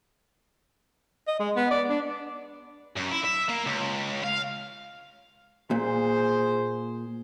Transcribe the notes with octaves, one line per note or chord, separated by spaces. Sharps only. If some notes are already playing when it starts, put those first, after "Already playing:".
D#5
G#3
B3
D5
D4
F#2
E4
E5
A#3
C#2
F5
A#2 G#4 C5